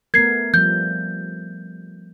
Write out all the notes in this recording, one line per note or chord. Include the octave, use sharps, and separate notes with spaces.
A3 B3 A#4 G#6 C7
F3 G3 G6